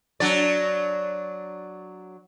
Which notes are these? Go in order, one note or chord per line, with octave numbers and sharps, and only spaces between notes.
F#3 D4 D5